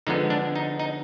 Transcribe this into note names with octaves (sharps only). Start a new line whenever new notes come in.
D3 F3 G#3 B3 D#4
D4
D#4
D#4